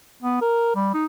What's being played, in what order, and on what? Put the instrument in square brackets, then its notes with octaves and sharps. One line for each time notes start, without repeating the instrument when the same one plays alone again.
[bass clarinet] B3
A#4
G3
D#4